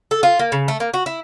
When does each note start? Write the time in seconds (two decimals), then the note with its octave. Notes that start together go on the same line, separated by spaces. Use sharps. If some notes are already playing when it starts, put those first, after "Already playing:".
0.11 A4
0.23 F4
0.39 A#3
0.52 C#3
0.68 A3
0.80 A#3
0.94 F#4
1.06 E4